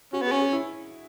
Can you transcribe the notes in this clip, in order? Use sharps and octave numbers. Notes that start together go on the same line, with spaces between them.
C#4 F#4
B3 G#4
C#4
G#4
E4